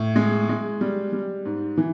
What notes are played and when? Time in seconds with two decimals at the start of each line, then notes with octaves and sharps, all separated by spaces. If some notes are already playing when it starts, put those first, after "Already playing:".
Already playing: A2
0.16 G#3
0.49 G#3
0.81 G3
1.13 G3
1.45 G#2
1.78 E3